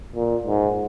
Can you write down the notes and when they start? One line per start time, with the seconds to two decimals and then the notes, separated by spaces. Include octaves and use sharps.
0.16 A#2
0.46 G#2